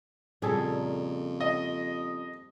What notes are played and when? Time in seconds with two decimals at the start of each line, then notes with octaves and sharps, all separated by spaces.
0.42 F2 A#2 C#3 G3 G#4 A4
1.40 D#5